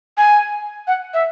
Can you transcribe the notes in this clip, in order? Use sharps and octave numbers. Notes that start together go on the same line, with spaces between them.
G#5
F#5
E5